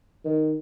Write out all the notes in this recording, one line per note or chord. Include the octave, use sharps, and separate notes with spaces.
D#3